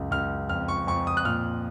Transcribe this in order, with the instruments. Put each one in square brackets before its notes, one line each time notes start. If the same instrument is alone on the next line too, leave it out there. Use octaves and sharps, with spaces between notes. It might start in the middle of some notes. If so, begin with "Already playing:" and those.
Already playing: [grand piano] C#2 F#2
C#2 F6
F2 F6
C#6
F2 C#6
D#6
F#6
A#2 F6